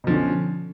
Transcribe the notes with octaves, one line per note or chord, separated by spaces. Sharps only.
B2 D3 F3 C#4